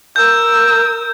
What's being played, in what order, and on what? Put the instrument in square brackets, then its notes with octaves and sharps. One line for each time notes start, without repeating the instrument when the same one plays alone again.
[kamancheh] A#4 E6 [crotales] G6